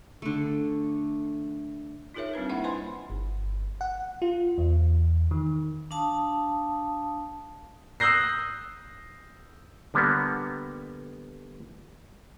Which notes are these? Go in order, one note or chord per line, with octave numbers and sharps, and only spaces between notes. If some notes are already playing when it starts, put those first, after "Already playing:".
D3 A3
D#4 F4 G#4 A#4 C#5 E5
G3 C4 D4 B4
A#3 E4 E5 F#5 B5
B4 C5 D#5 G#5 B5 C6
G1
F#5
F4
E2
D#3
D4 F5 A5 D#6
D#6 E6 F#6 G6 A#6 C7
D3 G3 A#3 B3